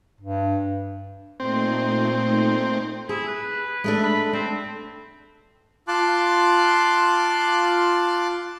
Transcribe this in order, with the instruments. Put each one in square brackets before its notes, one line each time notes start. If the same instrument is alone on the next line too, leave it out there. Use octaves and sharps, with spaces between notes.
[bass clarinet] G2
[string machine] A#2 A3 D#4 [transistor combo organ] C4
[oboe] E4 [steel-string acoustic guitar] G#4
[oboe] B4
[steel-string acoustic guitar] G#3 A3 D4
[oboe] B5
[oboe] C4 [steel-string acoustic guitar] D4
[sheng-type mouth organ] F4 A5 C6 D6 F#6